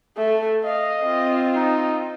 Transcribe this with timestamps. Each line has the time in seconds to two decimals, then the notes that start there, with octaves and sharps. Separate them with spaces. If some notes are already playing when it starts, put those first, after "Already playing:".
0.17 A3
0.64 D#5 F5
1.03 C4 F4
1.55 D#4